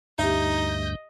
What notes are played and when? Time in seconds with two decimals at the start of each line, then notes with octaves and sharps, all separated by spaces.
0.19 D2 G2 D#4 G4 D#5 E5 G6